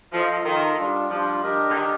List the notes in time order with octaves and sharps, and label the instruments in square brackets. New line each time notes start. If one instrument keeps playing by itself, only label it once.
[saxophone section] F3 [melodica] F4 A4 D#5
[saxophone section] D#3 [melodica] F4 A4 D#5
[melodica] G3 D4 F4
[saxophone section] F3 [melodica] G3 D4 F4
[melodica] D4 G4 A#4 D#5
[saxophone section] D3
[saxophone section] D#3 [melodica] D4 G4 A#4 D#5